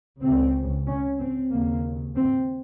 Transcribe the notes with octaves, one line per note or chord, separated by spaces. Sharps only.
C#2 C#3 C4
C#4
C4
D#2 C#3 A#3
C4